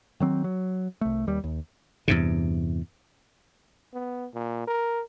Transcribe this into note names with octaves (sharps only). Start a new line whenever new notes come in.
D#3 F#3 C4
F#3
C2 A3
D#2 G3
D#2
E2 G2 C3
B3
A#2
A#4